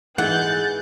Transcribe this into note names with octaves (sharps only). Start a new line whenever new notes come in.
G#2 E3 E4 G#4 F#5 F#6 G6 A6